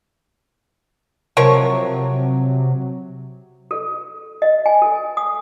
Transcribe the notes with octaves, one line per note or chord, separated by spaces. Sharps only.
C3 F3 F#3 A#4 C#5
A4
D#5
G#5
A4
D#6